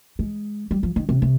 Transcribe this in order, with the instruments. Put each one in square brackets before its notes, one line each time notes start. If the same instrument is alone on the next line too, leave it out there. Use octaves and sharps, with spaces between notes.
[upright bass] G#3
G3
F3
D#3
C3
C3